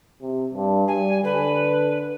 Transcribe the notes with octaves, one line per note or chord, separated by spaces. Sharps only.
C3
G2
G3 G#5
D3 B4